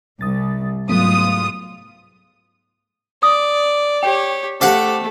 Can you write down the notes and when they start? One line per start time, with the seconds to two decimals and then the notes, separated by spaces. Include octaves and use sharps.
0.21 C2 D#6 A6
0.89 G#2 F#3 A3 B3 F4 D#6
3.23 D5 D#6
4.03 G4 C#5 G5
4.61 A3 G4 C5 F5 F#5